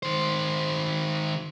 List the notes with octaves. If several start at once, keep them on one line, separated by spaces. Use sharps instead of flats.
D#3 C5